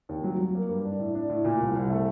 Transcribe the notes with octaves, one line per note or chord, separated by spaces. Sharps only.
D#2
F#3
F#3
A#3
G2
D4
A2
D4
A2
A#2
C2
C2
A3